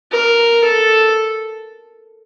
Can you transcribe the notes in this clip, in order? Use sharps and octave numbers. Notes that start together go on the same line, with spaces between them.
A#4
A4